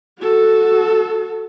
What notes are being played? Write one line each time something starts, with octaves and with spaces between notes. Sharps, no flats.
F#4 A4